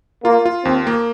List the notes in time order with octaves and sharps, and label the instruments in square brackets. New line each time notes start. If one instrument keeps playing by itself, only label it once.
[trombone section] A#3 [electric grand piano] F4
[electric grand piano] F4
[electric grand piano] D#2 [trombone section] C4
[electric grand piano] A#3